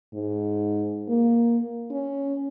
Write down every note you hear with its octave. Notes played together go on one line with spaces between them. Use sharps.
G#2
A#3
C#4